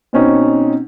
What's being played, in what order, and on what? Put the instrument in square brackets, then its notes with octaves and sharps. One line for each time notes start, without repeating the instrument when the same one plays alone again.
[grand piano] B2 C4 C#4 D#4